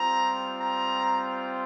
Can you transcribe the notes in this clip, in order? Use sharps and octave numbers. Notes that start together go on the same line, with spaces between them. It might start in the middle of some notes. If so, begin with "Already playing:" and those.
Already playing: G3 C4 F4 A#5
A#5